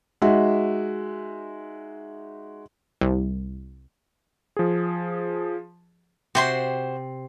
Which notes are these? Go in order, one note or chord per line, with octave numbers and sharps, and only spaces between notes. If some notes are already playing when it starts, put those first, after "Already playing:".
G#3 D#4 F#4 E5
C2
F3 G#4
C3 F#4 C5 C6